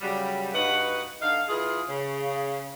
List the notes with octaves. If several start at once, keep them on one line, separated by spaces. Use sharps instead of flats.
C#3 F#3 G3
G2 D#4 F#4 B4 F#5
D3 D#4 F5
E3 F4 G#4
C#3